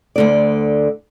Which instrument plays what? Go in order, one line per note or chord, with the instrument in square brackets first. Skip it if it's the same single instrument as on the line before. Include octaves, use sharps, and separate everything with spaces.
[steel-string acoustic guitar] D2 D3 D5